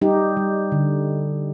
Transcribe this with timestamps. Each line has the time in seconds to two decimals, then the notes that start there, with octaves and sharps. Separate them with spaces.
0.01 G3 D#4 G4
0.37 G3
0.72 D3